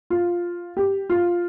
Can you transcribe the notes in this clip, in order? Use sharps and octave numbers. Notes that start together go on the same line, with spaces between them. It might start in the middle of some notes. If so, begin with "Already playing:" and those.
F4
G4
F4